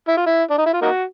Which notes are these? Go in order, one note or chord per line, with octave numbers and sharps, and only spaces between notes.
E4
F4
E4
D4
D#4
E4
F4
A#3 D#4 F#4